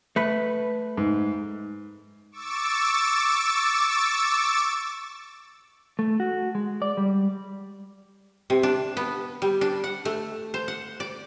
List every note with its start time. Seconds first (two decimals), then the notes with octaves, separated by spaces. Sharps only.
0.16 A3 B4
0.98 G#2
2.31 C#6 D6 E6 A6
5.99 A3
6.20 F#4
6.55 G#3
6.82 D5
6.97 G3
8.50 C3
8.63 D4
8.97 B3
9.42 G3
9.61 D4
9.84 F#5
10.05 A3
10.54 C5
10.68 F#5
11.00 D5